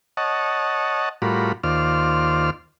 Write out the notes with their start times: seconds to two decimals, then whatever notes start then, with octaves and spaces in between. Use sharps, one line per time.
0.17 C#5 D#5 F#5 A5
1.22 A2 G3 F4 F#4 A#4 B5
1.64 D#2 F4 C5 D5 F6